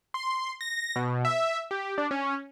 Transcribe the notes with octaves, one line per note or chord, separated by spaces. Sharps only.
C6
A#6
B2
E5
G4
D4
C#4